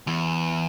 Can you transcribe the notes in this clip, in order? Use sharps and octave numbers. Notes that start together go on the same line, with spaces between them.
E2